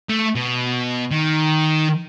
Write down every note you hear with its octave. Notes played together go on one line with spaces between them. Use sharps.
A3
B2
D#3